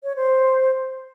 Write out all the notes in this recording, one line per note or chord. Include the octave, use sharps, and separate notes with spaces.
C#5
C5